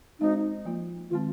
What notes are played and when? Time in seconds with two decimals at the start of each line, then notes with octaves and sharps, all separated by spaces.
0.20 G#3 C4 D#4 F#4 C5
0.65 F3 A#3 F4
1.10 D#3 G#3 C4 F4